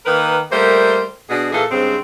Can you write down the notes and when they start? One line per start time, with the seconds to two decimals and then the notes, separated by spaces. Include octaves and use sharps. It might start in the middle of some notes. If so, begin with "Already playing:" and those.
0.06 D#3 A#3 A#4 B4
0.52 G3 A3 A#3 A#4 C5
1.30 B2 D4 G#4
1.53 A#2 E3 G#4 A4
1.71 G2 C#3 G#3 C4